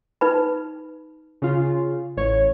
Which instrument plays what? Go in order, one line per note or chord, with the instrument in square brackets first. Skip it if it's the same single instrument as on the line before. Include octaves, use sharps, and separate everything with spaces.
[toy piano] D#4 B4 B5
[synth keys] C#3 F4
A1 C#5